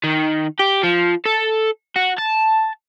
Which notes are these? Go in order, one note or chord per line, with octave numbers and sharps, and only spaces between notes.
D#3
G4
F3
A4
F#4
A5